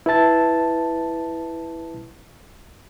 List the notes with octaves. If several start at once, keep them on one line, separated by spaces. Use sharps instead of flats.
E4 B4 E5 A5 A6